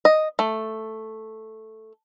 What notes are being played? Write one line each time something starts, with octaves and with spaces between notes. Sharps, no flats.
D#5
A3